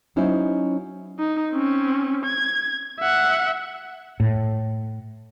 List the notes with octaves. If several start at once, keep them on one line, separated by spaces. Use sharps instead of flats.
F#3 C#4 D#4 E4 C5
D#4
C4 C#4
G#6
E5 F#5
A2